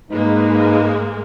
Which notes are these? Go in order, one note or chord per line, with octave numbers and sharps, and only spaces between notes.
G#2 G#3 A#3 D#4 B4